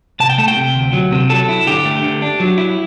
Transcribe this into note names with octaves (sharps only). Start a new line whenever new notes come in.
C3 A5
G5
A3 A5
G5
C3
D2
F#3
C3
F#3 A4
E4
D3 G4
A3
D3
D4
F#3
E4